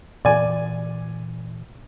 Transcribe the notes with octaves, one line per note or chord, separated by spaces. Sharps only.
A#2 E3 D5 G#5